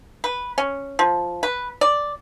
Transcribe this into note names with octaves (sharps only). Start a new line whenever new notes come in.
B4
C#4
F3
B4
D5